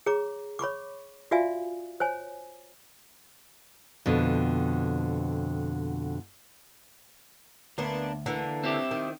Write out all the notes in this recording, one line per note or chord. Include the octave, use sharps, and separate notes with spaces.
G#4 C#5 A#5 D6
C#5 B5 C#6 D6
F4 F#4 D5 E5 F5 G#5
C5 C#5 G#5
F2 B2 D3
D2 A#3 B3 D4
D3 E3 A#3
C4 E4 G4
D#3